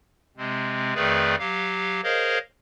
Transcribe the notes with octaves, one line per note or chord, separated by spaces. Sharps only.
C3 G#3 C4
F2 D#3 A3 G#4 B4 D5
F#3 G4 F5
G#4 A#4 C5 C#5 D#5 F5